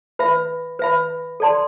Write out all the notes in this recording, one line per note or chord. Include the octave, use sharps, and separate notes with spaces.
B4 E5 B5
B4 E5 B5
A4 D5 A5 C6